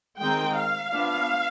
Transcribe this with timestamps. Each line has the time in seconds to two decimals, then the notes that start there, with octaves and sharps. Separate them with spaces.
0.20 D#3 G#3 C4 D#4 G5
0.56 F5
0.93 F3 B3 D4